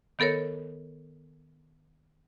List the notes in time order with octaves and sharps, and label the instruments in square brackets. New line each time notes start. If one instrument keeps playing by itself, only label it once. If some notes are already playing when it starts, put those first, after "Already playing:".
[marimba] D#3 B3 A4 A#4 C#5